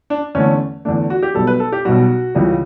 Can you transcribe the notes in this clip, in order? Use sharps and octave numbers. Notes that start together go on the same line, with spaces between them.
D4
E2 D3 A3 C#4
E2 D3 A3 D4
F#4
G4
B1 B2 G3 A4
B4
A4
G4
B1 B2 G3 F#4
C#2 C#3 E3 G3